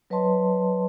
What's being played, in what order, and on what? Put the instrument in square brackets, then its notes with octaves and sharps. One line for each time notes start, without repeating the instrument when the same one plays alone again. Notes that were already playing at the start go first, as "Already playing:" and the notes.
[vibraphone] F#3 B4 C#5 D#5 A5 C6